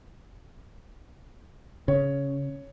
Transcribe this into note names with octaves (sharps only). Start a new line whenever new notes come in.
C#3 C#5